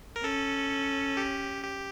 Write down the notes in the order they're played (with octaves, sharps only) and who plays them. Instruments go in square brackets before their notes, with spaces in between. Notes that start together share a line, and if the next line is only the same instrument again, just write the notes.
[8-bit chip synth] A#4
[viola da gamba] C#4 [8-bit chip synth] A4
[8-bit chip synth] G4
G4